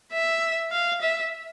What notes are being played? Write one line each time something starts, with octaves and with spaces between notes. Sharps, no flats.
E5
F5
E5